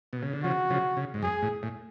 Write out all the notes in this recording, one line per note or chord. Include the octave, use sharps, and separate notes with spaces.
B2
C#3
D3
C#3 F3 F#4
C#3 F3
C#3
G#2
F#2 G#4
A2
A2